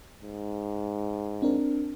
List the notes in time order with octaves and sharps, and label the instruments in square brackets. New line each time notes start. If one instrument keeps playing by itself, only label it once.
[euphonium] G#2
[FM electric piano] C4 D4 A#4